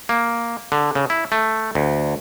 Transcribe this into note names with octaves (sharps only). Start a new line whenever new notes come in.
A#3
D3
C#3
E4
A3
D2